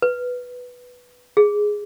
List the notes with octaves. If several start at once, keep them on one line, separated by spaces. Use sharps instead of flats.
B4
G#4